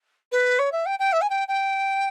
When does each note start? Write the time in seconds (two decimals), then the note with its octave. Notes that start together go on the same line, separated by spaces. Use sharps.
0.32 B4
0.59 C#5
0.72 E5
0.86 G5
0.99 G5
1.13 E5
1.22 G#5
1.30 G5
1.48 G5